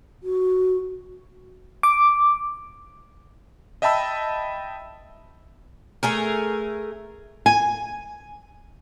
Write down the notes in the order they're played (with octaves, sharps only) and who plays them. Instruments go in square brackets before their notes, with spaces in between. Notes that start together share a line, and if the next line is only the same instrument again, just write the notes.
[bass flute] F#4
[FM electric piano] D6
[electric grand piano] D#5 E5 G5 A5 B5 E6
[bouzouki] A3 G#4 A#4
[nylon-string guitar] G#5